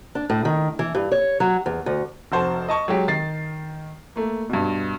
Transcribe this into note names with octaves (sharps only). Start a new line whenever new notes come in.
D4
A2
D#3
E3
G2
C#5
F#3
E2
D2
F1 F#4 C5 A5
D#5 A5 C#6
F#3 G#3 G4
D#3 A6 C7
A3 A#3
G2 B2